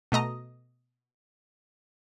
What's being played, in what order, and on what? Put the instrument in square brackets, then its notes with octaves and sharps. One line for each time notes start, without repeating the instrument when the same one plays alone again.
[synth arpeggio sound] B2 A3 D#5 A#5